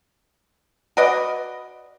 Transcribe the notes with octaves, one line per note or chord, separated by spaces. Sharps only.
F#4 B4 D5 D#5